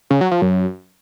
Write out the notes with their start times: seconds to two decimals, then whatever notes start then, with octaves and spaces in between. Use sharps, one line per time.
0.10 C#3
0.21 F#3
0.31 F3
0.42 F#2